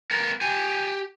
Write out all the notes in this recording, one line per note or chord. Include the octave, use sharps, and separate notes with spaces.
B3 A#4
G4 G#5